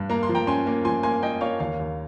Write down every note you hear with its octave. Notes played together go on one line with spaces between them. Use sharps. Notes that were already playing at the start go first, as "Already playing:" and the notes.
Already playing: G2
A#3 A#5
C6
F3
G5 A#5
C#4 G#5 C6
A#3
F3 G#5 C6
A#3 G#5 C6
A#3 D#5 G5
A#3 C#5 F5
D#2 C#5 F5
D#2